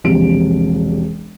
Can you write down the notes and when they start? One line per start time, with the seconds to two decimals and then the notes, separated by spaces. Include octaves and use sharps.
0.04 E1 A#1 C3 D7